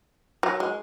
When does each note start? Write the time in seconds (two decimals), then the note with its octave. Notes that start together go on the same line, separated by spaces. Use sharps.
0.43 F#3
0.60 G#3